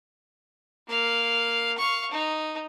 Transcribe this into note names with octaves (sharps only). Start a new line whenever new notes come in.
A#3 F5
F5 C#6
D#4